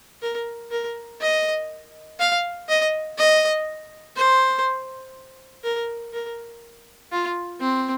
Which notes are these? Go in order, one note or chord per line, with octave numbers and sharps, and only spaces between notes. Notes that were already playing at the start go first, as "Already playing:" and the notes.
A#4
A#4
D#5
F5
D#5
D#5
C5
A#4
A#4
F4
C4